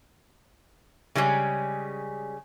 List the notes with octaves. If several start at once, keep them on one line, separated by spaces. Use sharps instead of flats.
C#3 G3 G#3 C#4